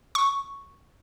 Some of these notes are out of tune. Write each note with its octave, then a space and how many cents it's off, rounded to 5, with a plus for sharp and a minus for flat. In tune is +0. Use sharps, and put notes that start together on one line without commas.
C#6 -5